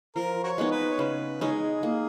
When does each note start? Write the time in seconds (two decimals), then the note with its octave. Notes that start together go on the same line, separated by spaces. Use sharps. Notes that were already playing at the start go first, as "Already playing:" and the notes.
0.16 F3 A#4
0.44 F#4 A#4 C#5
0.58 G#3 B3 D#4
0.71 B4
0.90 C#5
0.99 C#3 B4
1.41 G#3 C#4 D#4 G#4
1.83 A#3